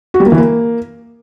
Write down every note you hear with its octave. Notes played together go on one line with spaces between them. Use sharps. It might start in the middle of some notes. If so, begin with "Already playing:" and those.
F#4
G3
A#3
E3
A#3